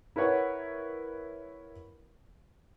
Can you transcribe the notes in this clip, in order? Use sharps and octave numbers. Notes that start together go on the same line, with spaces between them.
E4 A#4 B4 C#5 F#5